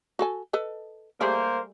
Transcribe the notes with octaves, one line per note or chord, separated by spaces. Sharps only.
F#4 A4 G#5
A4 B4 D#5
G3 A3 A#3 G#4 A#4 C5